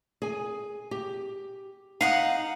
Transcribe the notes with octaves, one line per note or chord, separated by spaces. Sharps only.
G#4 G#5
G4
D#4 F5 F#5 D#6